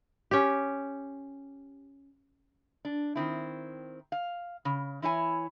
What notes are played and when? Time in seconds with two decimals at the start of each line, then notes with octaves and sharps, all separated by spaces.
0.31 C#4 G4
2.85 D4
3.15 D#3 C4 E4
4.12 F5
4.65 C#3
5.02 E3 E4 C#5 G#5